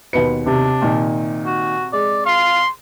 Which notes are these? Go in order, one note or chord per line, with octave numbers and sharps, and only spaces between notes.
D#2 B2 B4 C#7
C3 D4
A#2 D#3
F#4
G#3 D5
F5 C6